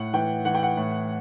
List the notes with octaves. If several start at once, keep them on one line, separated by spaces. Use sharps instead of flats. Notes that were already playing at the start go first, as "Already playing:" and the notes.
Already playing: A2 F#5
E3 G5
E3 F#5
G5
F#5
A2